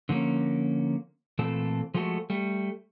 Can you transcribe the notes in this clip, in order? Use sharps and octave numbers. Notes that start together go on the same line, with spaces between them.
D3 F3 F#3 A#3 C#4
A#2 E3 A3 C4 A4
F3 G#3 A3 F#4 A4
G3 A3